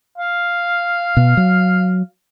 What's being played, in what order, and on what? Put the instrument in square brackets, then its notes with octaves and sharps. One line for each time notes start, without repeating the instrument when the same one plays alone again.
[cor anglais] F5
[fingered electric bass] B2
F#3